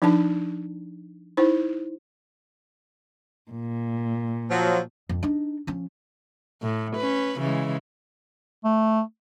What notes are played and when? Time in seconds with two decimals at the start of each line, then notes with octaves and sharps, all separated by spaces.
0.02 F3 D4 D#4 A5
1.37 D#4 E4 C5
3.51 A#2
4.50 F3 F#3
5.09 F2
5.23 D4 D#4
5.67 F3 C#4
6.62 A2
6.96 C#4 B4
7.39 C#3 E3 G#3
8.64 A3